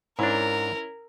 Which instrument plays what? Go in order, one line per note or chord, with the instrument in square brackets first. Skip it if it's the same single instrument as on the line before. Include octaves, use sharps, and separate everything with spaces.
[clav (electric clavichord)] G#2 D4 [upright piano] C#4 E4 [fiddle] A#4